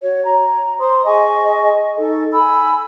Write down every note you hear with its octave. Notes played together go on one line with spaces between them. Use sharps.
F#4 C#5
A#5
C5 C6 D#6
G#4 D#5 G#5 C#6
D#4 A4
G#5 B5 E6